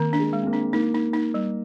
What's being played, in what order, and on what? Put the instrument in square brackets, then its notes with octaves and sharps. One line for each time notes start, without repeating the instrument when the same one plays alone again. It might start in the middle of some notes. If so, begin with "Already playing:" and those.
Already playing: [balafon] D#3 [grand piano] A#3 C4
[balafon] D4
[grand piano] G#3
[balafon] G#3
[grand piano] C4
A#3
[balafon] D4
[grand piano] A#3 [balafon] D#4
[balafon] D#4
D#4
G3